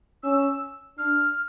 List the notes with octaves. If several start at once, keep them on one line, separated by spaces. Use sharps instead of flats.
C#4 E6
D4 F6